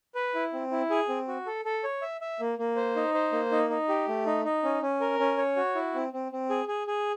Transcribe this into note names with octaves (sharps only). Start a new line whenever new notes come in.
B4
E4
C4
E4
G#4
C4
F#4
A4
A4
C#5
E5
E5
A#3
A#3
C5
D#4
C5
A#3
D#4
D#4
G4
A3
D#4
D#4
C#4
C#4
A#4
C#4
C#5
F#4
E4
C4
C4
C4
G#4
G#4
G#4